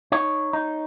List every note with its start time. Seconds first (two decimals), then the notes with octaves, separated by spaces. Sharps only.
0.12 D#4 C#5
0.53 D#4